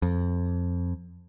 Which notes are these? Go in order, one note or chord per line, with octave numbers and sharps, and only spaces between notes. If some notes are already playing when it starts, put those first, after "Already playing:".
F2